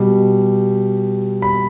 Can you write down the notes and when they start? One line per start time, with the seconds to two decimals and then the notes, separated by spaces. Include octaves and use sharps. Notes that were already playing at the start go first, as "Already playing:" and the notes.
Already playing: B2 G3
1.42 B5